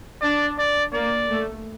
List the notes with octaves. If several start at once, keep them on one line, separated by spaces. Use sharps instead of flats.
D4 D5
D5
A#3 D5
A3